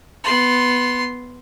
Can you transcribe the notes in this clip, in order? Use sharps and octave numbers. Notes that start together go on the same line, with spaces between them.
B3 C6